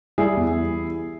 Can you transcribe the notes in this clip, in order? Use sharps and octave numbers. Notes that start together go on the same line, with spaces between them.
G3 E4 G#4
E2